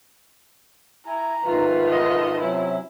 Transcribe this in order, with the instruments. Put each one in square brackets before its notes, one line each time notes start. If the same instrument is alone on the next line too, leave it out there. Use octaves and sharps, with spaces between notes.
[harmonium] E4 G#5 [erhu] A#5
[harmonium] G#2 D#3 [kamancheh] A3 F4 [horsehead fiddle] B4
[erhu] D#5
[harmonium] C3 F#3 C#4 [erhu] E4